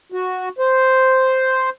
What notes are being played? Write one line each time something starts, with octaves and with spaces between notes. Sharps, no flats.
F#4
C5